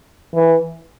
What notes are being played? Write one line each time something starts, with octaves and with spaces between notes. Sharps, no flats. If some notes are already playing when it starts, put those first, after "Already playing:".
E3